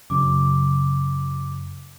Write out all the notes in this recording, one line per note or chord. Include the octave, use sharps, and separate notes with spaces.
F#2 C#3 F#3 D6